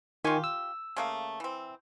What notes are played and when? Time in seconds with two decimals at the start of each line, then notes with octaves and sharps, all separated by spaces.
0.24 D#3 F4 G4 G#5 C#6
0.44 E6
0.97 C#3 A3 A#3
1.40 E3 C4